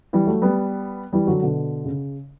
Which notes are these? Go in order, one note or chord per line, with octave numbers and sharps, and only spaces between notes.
E3 G3
F#3 A3
G3 B3
E3 G3
D3 F#3
B2 D3
C#3